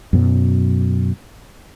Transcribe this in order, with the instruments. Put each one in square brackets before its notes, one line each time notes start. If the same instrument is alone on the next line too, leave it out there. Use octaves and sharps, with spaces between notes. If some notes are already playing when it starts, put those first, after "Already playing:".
[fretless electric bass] F#2 B2 F#3